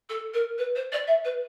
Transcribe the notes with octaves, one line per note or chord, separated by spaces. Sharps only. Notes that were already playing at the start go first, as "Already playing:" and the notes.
A4
A#4
B4
C5
D5
E5
B4